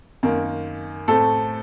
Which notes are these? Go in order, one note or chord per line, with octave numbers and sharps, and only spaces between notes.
F#2 D#3 A#3
A2 A3 C4 A4